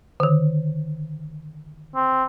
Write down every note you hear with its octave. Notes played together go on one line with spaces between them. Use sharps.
D3 D#3
C4